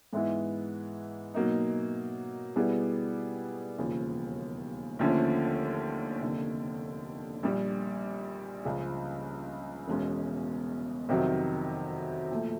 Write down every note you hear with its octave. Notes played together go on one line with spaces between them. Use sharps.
G#2 E3 G#3 B3 E4
B2 F#3 A#3 D#4
B2 G3 B3 E4 G#4
E1 D#2 C#3 F3
D#2 D3 F3 A3 C#4
F1 D#2 D3
A#1 A#2 G3
C#2 C#3 F3
E1 E2 B2 G#3 C#4
F2 C3 D#3 F#3
A#2 F3 A3